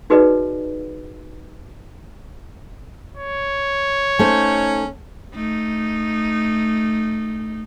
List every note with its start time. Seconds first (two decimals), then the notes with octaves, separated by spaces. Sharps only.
0.10 D#4 F#4 G#4 B4 D5 D#5
3.17 C#5
4.19 A3 C#4 D#4 C5
5.34 A3 D#4